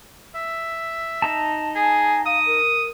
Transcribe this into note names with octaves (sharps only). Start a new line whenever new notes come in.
E5
D#4 A5
G#4 G#5
F5 D#6
A#4